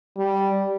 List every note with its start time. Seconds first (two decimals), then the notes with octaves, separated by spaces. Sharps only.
0.17 G3